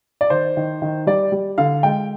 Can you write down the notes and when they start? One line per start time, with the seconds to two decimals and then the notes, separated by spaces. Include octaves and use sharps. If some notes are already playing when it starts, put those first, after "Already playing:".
0.21 D5
0.30 D#3 C5
0.57 D#3
0.82 D#3
1.07 G3 D5
1.32 G3
1.58 D3 F5
1.83 G#3 G5